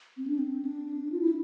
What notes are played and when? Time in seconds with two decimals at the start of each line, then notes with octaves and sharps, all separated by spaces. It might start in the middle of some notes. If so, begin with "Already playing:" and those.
0.17 C4
0.28 D4
0.39 C4
0.65 D4
1.12 F4
1.21 E4